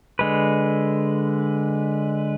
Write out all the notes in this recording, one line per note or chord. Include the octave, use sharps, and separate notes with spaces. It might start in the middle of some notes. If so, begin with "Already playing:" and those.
D3 G#3 B4